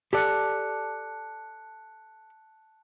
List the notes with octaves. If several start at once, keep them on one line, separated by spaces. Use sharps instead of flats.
G4 A4 D5 A5 F#6 C#7